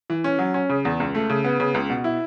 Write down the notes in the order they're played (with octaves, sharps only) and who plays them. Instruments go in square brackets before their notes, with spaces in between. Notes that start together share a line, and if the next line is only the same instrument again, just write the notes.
[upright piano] E3
C#4
F#3
C#4
C#3
E2
C#2
A3
C#3
B3
C#3
C#2
B2
E4